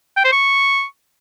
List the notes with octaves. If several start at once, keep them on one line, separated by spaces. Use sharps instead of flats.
G5
C5
C#6